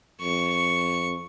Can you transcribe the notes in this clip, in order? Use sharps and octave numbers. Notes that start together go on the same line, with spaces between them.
F2 C#6